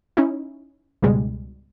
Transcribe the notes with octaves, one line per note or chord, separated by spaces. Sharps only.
C#4 D#4 E4
C#2 G#2 B2 G3 G#3